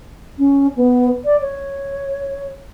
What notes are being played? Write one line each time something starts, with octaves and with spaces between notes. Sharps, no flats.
C#4
B3
D5
C#5